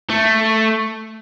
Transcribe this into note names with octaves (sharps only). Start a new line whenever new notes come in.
A3